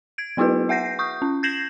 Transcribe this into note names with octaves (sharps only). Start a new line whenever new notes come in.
G#6 D7
F#3 B3 E4 F#4 G#4 B4
E5 F#5 G6 A#6 C7
C#6 D#6 G6
C#4
G6 G#6 A#6 C7 E7 F#7